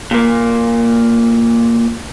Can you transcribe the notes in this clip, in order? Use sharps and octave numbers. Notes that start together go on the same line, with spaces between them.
A#2 A#3